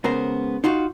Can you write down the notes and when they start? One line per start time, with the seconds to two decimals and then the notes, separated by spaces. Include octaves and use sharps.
0.04 C#2 C#3 B3 A#4 C5
0.64 D#4 F4 F#4 F5